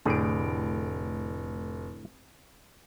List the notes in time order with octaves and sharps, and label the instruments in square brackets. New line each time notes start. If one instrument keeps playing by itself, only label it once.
[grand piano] F1 D7 [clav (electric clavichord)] A2 D3 G#4